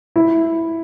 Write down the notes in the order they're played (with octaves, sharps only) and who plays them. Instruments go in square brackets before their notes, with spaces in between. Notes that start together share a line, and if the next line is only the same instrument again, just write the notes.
[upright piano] E4